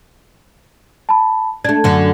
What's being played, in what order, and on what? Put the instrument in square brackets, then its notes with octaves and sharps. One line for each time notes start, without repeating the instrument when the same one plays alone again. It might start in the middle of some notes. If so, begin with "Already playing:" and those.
[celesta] A5 B5
[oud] A3 D4 [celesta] G#6
[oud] F#2 D3